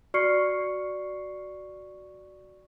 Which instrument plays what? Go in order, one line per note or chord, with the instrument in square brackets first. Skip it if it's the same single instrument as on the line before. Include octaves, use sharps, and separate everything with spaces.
[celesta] F#4 D5 C#6 F6 C7 C#7